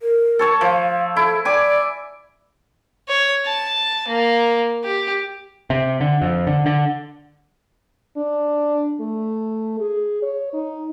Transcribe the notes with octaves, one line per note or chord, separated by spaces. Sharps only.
A#4
A4 C#5 A5
F3 F5
E4 A4
D5 G#5 D6
C#5
A5
A#3
G4
C3
D3
F2
D3
D3
D4
A3
G#4
C#5
D#4